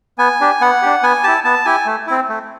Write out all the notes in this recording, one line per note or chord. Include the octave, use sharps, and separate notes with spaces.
B3 G#5
D4 G4
B3 F#5
D4 G4
B3 G#5
E4 G4 A5
B3 A5
E4 G4 G#5
A3
C4 E4
A3